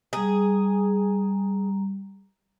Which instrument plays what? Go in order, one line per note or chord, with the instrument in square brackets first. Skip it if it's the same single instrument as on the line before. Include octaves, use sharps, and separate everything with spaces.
[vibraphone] G3 A#5 [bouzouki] G#4